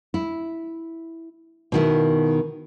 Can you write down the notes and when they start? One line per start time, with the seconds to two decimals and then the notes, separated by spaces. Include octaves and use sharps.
0.14 E4
1.72 B2 D#3 E4